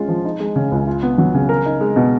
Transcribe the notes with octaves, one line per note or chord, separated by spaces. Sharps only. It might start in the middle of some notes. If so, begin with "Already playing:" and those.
Already playing: G#3 C#4 F4
F3
D#4
G#3
C#3
C#2
F4
B3
F#3
C#3
A#4
D#4
G#3
B2